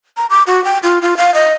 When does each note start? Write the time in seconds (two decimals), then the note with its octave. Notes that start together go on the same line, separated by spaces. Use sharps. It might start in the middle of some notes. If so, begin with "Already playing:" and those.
0.17 A#5
0.30 D6
0.47 F#4
0.65 G5
0.83 F4
1.02 F4
1.17 F5
1.34 D#5